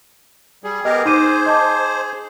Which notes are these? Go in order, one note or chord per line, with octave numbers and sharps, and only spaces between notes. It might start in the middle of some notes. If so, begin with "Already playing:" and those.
G3 G#4
B3 G4 A#4 D#5
D#4 C5 D6 D#7
D#5 A5 D6